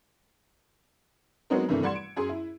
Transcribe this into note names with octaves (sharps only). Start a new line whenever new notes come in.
F#3 G#3 B3 C4 D#4 A#4
G2 C3 D#3 E3 A3
G3 F#5 C6 G#6 C#7 E7
D7
F#2 G#4 C6 D#7
E4